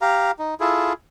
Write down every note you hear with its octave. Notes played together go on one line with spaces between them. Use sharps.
G4 F5 A#5
D#4
E4 F4 G#4 A4